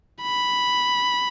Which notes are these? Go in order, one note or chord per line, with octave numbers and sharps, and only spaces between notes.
B5